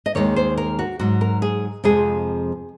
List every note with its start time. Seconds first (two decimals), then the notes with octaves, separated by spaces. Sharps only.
0.06 D#5
0.15 D#2 D#3 G#3 C#5
0.36 C5
0.57 A#4
0.79 F#4
0.99 G#2 F#3 F#4
1.21 A#4
1.42 G#4
1.84 F2 C3 F3 G#3 G#4